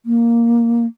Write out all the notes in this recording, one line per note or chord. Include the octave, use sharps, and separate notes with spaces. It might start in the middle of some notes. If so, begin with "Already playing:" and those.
A#3